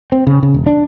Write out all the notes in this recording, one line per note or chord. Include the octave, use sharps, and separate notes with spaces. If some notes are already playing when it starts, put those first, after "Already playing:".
C4
C#3
C#3
E1
D4